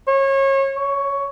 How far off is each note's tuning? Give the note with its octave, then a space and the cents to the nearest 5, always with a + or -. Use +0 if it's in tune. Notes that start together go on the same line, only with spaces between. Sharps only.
C#5 -30
C#5 +10